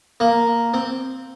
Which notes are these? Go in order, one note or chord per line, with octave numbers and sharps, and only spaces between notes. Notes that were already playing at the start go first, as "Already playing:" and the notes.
A#3
C4